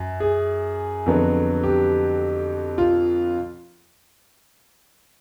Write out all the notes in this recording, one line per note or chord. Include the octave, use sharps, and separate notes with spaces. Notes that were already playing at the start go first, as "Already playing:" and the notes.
Already playing: F#2
G#4
F2 D3 F#3 B3
G4
F4